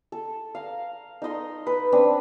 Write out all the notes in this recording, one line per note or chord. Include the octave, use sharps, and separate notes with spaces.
A4
F5 A#5
D#4 A4 D#5 C6
B4
C4 D4 B4